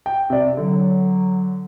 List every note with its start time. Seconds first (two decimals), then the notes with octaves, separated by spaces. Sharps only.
0.06 G5
0.30 C3 D5
0.57 D3 F#3